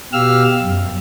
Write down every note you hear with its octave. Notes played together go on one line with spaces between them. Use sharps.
B2 G4 F5 E6 F6
F#2